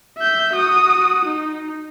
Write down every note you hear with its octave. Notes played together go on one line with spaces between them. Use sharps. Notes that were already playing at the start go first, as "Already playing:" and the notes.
E5 G6
F#4 D#6
D#4